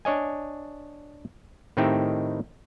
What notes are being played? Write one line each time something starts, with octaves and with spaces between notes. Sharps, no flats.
D4 C#5 D#5 G#5
A2 D#3 C4 D#4 G4 E5